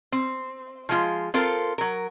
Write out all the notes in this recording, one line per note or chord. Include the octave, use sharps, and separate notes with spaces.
C4
F3 G#3 F4
C4 F4 A4 A#4
F#3 A#4